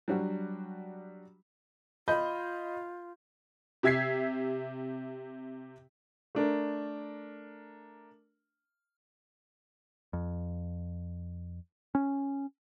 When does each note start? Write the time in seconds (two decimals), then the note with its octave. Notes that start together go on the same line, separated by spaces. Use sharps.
0.08 F#3 G3 D4 F#4
2.08 F4 D#5 B5 G6
3.83 C3 G4 E5 G#6 B6 C7
6.35 A3 D4 A#4
10.13 F2
11.95 C#4